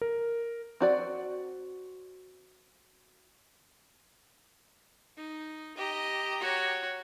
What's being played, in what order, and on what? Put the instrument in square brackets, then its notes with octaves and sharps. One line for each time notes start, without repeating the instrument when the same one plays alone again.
[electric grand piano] A#4
[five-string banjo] C4 F#4 D5
[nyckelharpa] D#4
[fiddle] G4 A#5 [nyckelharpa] D#5
[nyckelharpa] F#4 C#5